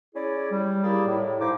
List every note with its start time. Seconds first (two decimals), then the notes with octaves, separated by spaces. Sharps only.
0.14 C#4 E4 G#4 D5
0.51 G3
0.84 A#3 E4 G4 G#4 D5
1.06 A2
1.40 F3 D#4 E4 C5 D6